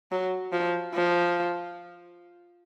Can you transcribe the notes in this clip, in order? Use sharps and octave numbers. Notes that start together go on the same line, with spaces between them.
F#3
F3
F3